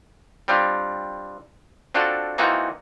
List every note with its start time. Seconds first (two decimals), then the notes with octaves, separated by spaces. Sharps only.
0.48 G3 C4 D4 F4
1.94 C4 D4 F4 F#4 A4
2.38 E3 A#3 C4 D#4 F4 F#4